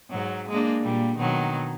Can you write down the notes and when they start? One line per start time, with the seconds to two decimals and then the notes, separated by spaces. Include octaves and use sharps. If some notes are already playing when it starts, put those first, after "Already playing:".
0.10 G#2 F#3
0.49 G#3 A#3 D4
0.81 A#2 G3
1.17 B2 D#3 F#3